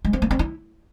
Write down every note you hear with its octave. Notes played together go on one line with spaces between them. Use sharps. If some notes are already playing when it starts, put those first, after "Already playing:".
G#3
C4
A#3
C4
E4